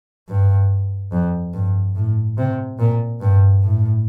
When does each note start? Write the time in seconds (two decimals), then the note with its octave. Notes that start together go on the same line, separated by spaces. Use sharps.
0.29 G2
1.12 F2
1.54 G2
1.96 A2
2.38 C3
2.79 A#2
3.21 G2
3.63 A2